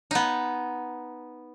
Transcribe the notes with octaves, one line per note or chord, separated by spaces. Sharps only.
B3 D#4